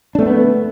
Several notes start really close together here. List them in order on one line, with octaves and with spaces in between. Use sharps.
D4 A3 C4 B3